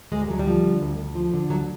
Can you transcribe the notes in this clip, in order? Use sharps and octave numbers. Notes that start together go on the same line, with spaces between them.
D2 G#3
G3
D2 F#3
G3
F3
D3
D2
D2
F3
D3
D2 F#3